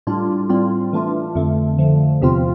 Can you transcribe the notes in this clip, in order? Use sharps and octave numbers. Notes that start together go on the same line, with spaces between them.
A2 G3 D4 F4
A2 G3 C4 F4
E3 A3 D4 F4
F2 D3 A3
D3 F3 A3
E2 C3 F3 C4 F4